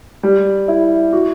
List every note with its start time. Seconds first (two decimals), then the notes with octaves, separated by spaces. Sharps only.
0.23 G3
0.68 E4
1.13 F#4